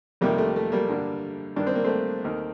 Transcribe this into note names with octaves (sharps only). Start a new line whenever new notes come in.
F2 C3 D#3 G3 A#3
A3
A3
G3 A#3
G2 D3
G2 D#3 D4
C4
A#3
A3 C4
D#2 D#3